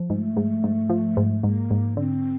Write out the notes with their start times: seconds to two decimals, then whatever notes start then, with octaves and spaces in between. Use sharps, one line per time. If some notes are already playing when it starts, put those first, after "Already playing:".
Already playing: F3
0.10 G#2 A3
0.37 G#2
0.64 G#2
0.90 F3
1.17 G#2
1.43 G#2 A#3
1.71 G#2
1.97 D3 C4